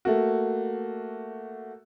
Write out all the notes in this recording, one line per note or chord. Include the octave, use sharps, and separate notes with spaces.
A3 A#3 F#4